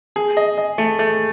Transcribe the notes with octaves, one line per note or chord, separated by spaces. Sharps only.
G#4
D#5
D#5
A3
A3